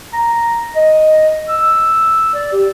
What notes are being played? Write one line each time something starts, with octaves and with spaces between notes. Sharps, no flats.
A#5
D#5
E6
D5
G4